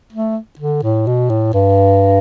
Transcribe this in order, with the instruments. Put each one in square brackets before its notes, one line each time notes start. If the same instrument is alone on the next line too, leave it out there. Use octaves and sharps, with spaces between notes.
[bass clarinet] A3
D3
A2
B2
A2
G2